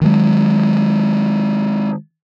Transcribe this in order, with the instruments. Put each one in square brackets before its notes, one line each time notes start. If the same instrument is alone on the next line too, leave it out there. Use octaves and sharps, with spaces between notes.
[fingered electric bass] D#3 F#3 G#3